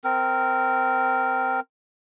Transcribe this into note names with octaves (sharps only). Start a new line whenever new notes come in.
C4 A#4